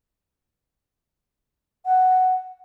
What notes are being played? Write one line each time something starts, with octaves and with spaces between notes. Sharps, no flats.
F#5